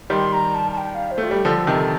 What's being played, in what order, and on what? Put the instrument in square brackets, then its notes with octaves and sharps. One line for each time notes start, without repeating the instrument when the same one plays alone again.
[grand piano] D#3 G3 [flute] C6
[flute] A#5
A5
A5
G5
F5
C5
[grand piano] A3 [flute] F4
[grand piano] G3 [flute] G4
[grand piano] D3 F3 [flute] A4
[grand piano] C3 D#3